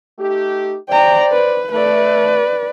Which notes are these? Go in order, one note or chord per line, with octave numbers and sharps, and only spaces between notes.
A3 D#4 G4
C5 D5 G5 A#5
B4
A3 B4 D5